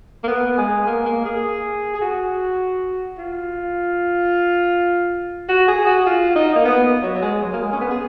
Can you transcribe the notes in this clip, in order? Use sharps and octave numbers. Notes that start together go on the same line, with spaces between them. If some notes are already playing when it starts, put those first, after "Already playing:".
A#3
B3
G#3
A#3
A#3
G#4
G#4
F#4
F4
F#4
G#4
F#4
F4
D#4
A#3
B3
F#3
F#3
G#3
F#3
A#3
G#3
C#4
B3
G#4